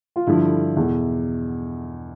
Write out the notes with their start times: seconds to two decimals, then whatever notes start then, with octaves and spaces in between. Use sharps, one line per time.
0.16 F4
0.27 G2 D3 F3 E4
0.77 E2 B2